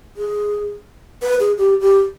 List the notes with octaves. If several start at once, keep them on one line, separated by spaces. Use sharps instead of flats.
G#4
B4
G#4
G4
G4